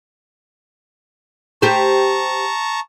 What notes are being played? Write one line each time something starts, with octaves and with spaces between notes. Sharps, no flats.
G4 C5 A5 A#5 C#6